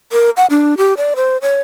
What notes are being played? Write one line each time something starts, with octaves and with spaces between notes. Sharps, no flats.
A#4
F#5
D4
G4
D5
C5
C#5